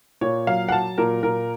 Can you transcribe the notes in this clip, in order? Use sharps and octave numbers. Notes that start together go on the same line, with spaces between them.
A#2 C#5
F#3 F5
F#5
F#3 A5
A#2 A#4
A#2 A#4